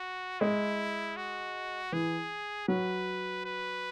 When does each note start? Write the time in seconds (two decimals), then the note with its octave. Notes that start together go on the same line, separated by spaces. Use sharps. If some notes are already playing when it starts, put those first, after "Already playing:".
Already playing: F#4
0.40 G#3 E4
1.16 F#4
1.92 E3 G#4
2.68 F#3 B4
3.46 B4